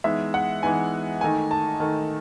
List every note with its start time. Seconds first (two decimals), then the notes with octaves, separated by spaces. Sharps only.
0.04 E3 G#3 B3 D#4 E5
0.34 F#5
0.62 E3 G#3 B3 D#4 G#5
1.21 D#3 A3 D#4 G#5
1.51 A5
1.80 D#3 A3 D#4